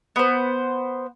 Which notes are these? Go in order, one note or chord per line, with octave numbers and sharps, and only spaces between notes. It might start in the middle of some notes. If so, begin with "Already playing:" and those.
B3 C5